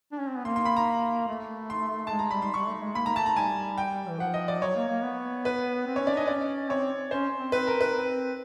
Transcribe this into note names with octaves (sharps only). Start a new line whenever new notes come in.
D4
C#4
C4
B3
A#3 C6
C6
B5
A#5
A3
C6
G#3 A5
A#5
G3 B5
C6
G3 C#6
A3
G#3
A#3 B5
A#5
A3 A5
A#5
G3 G#5
G5
E3
F3 F#5
D#5
D5
F#3 C#5
A#3
A#3
B3
B4
C4
C#4 C#5
D5
D4 D#5
C#4 D5
C4 C#5
C#4 C5
C4
C4 B4
A#4
B4
C4